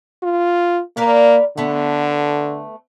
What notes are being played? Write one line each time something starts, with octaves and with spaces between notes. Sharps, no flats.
F4
A#3 A#4 B4 D5
D3 A3 B3